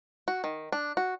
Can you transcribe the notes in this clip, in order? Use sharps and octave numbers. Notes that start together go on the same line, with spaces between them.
F#4
D#3
D4
F#4